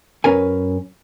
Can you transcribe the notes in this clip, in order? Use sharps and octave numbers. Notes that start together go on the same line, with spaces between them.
F#2 C#4 A#4 B4 G#5